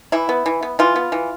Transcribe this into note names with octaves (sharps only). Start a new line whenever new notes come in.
E3 E4
B3
E3
B3
E3 F4
B3
E3